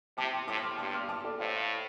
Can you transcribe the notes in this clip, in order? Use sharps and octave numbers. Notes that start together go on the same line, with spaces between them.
C3 A5 D6
G5 C6
A2 A5 D6
C6 F6
G2 A5 D6
C6 F6
A5 D6
A4 D5
A2 C5 F5